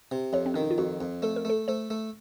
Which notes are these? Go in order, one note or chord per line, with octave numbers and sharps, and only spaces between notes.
C3
F2 C#5
C4
D#3 C#4
D#4
F4
F2 F#4
F2
A3 A4
A#4
A3 A4
A3 C5
A3